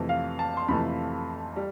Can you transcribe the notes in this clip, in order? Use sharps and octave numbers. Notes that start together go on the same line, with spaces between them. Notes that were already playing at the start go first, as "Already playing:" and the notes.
Already playing: F2 C3 E3 A3
F5
A5
C6
F2 C3 E3 A3 B5
G3